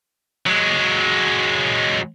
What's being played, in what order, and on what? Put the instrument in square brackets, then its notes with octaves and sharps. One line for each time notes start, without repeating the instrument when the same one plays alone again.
[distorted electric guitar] F#3 G#3